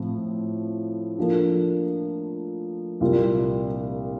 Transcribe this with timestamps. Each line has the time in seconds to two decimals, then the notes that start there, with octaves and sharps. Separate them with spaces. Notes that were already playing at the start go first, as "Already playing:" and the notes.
Already playing: A2 F3 C4
1.18 F3 A#3 D4 A4
3.00 C2 A#2 G3 A#3 F4